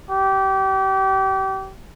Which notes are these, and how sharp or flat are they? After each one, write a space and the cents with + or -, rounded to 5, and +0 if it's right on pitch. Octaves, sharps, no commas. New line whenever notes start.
G4 -30